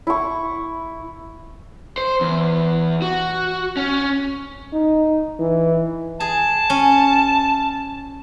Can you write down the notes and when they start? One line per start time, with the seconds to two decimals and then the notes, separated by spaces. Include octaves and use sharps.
0.07 E4 C#6
1.98 C5
2.21 E2
3.02 F#4
3.77 C#4
4.73 D#4
5.39 E3
6.20 G#4 A5
6.70 C#4